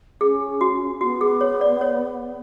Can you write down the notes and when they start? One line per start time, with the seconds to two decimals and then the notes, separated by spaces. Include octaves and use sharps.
0.21 C#4 G#4
0.61 F#4
1.01 B3 F#4
1.21 G#4
1.41 C#5
1.61 D5
1.81 C#5